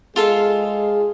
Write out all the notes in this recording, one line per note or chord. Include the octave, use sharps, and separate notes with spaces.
G#3 F4 G#4 A4 F5